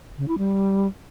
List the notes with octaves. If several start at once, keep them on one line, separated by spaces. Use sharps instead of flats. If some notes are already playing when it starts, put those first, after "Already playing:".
C#3
E4
G3